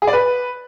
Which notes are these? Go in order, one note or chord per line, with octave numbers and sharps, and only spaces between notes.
G#4
D5
B4